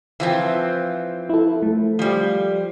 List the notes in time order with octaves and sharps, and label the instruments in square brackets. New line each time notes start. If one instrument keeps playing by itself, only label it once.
[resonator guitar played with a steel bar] E3 F3 C4
[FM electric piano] E4 A4
A3
[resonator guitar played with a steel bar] F3 G3